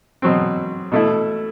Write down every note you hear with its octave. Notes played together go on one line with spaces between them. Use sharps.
B2 F#3 C4
B2 A3 E4